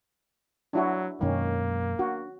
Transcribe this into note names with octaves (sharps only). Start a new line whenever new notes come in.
F#3 D4 E4 F#4
F#2 B2 D#3 G#3 A#3 C#4
D4 F#4